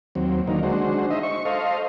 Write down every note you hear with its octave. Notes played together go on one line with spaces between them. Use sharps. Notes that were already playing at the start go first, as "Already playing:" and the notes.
D#2 F#3 C4
D3 D#3 F#3 A#3 D#4
G#3 D4 F#4 C5
D#4 C5 D#5 E5
C#6
A4 C5 D#5 F5